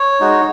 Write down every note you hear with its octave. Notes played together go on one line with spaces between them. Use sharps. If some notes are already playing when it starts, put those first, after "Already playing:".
Already playing: C#5
G#3 D#4 F#4